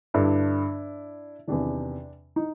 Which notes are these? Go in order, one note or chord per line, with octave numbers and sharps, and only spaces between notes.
G2 D3 D4 E4
E2 C3 D#3 D4
D#4